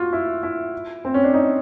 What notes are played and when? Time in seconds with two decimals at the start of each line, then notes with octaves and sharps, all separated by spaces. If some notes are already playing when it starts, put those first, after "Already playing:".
Already playing: F4 F#4
0.13 E4
0.43 E4
1.05 C4
1.14 C#4
1.24 D4
1.34 D#4